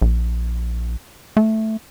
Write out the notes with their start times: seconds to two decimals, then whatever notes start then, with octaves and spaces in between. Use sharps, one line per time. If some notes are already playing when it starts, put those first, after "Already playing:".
0.02 A#1
1.37 A3